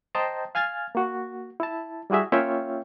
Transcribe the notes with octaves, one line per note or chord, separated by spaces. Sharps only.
C5 D#5 G5 A5 A#5
F5 G#5 F6 G#6 A6
A#3 F#4
E4 A5
G3 E4 F#4 G#4 E5
A#3 C#4 F4 C#5 E5 G5